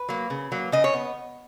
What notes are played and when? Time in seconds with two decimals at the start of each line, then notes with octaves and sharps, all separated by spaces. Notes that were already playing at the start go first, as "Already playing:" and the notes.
Already playing: B4
0.08 F#3 A#3
0.30 C#3
0.52 F#3 A#3
0.72 C#3 D#5
0.84 C#5
0.94 B3